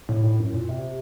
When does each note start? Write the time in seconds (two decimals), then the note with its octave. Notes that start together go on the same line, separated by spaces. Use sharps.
0.09 A2
0.24 A2
0.40 F#2
0.54 A#2
0.69 C3